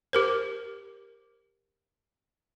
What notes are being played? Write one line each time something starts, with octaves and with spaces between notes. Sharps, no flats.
G4 A#4 C5